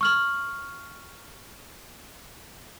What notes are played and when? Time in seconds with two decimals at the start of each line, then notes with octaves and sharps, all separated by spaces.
0.01 C#6 F6 F#7